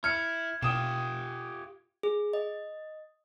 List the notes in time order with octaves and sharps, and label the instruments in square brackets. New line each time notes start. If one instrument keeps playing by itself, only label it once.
[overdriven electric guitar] E4 [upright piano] F6 C#7 [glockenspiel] G#6
[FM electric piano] B2 [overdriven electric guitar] F4 G4 [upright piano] G5 D#6 E7
[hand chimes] G#4
D#5